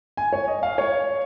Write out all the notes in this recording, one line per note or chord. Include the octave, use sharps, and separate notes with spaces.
G#5
C#5
D#5
F5
C#5